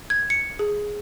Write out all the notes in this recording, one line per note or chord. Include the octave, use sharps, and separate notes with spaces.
G#6
C#7
G#4